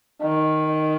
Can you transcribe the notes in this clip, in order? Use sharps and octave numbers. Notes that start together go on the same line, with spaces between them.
D#3